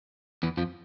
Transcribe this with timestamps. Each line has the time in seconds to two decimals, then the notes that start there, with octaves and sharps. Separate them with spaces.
0.43 E2 E3
0.57 F2 F3